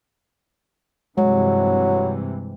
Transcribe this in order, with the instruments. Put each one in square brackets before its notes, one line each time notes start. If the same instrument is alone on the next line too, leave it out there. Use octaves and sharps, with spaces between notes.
[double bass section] G2 C3 E3 [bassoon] F#3 [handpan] G#3